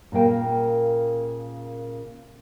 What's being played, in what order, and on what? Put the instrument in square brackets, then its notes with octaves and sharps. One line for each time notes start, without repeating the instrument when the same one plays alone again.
[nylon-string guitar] A#2 C#3 A#3 G5